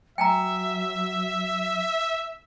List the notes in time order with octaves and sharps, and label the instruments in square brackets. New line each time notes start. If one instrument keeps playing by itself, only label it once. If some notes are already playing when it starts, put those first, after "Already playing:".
[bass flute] F#3 [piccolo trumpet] E5 [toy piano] G5 G#5 A#5